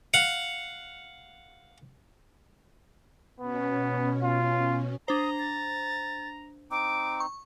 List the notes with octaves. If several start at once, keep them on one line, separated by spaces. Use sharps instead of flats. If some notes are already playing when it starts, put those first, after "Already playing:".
F5 F#5
B2 B3 C#4
F4
D4 C5 A#5 D#6
A6
C4 D#4 D6
C#6